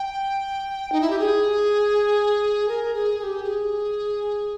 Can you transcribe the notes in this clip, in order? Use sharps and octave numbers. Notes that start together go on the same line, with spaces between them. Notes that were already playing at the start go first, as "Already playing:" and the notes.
Already playing: G5
D#4
E4
G4
G#4
A#4
G#4
G#4
G4
G#4